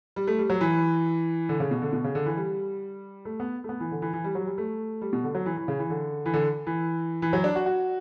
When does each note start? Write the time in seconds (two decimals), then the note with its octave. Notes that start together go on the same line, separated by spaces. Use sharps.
0.16 G3
0.27 A3
0.39 G3
0.50 F#3
0.61 E3
1.49 D3
1.60 C#3
1.71 B2
1.82 D3
1.93 B2
2.04 C#3
2.15 D3
2.26 E3
2.37 G3
3.25 A3
3.40 B3
3.64 A3
3.69 B3
3.80 E3
3.91 D3
4.02 E3
4.13 E3
4.24 G3
4.35 F#3
4.47 G3
4.58 A3
5.01 G3
5.13 B2
5.24 D3
5.35 F#3
5.46 E3
5.57 E3
5.68 C#3
5.79 E3
5.90 D3
6.26 E3
6.34 D3
6.67 E3
7.22 E3
7.33 F#3
7.44 D4
7.55 F#4
7.66 F#4